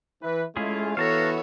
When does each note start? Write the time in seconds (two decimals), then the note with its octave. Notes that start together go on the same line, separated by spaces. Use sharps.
0.22 E3 B4
0.57 G#3 A3 C#4 E4 F4 G#4
0.97 E3 B3 F#4 A4 C#5 F5 A5 A#5